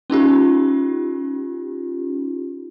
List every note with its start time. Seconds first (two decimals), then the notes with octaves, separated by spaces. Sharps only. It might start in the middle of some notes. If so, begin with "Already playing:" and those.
0.10 C#4 D#4 F4 G4